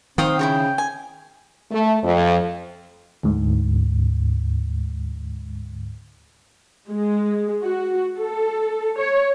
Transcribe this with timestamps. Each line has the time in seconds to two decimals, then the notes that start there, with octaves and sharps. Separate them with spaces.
0.18 D#3 C4 F5 G5 D#6
0.39 C#3 E4 F#4 C#5 G5
0.78 G#5
1.70 A3
2.02 F2
3.23 D2 G#2
6.89 G#3
7.63 F#4
8.19 A4
8.98 C#5